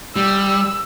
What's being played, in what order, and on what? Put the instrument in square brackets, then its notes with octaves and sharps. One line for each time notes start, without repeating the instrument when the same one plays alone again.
[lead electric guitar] G3 [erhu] E6